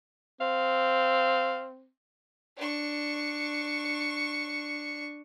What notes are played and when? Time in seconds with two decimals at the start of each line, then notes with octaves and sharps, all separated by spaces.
0.41 C4 F5
2.57 D4 C#6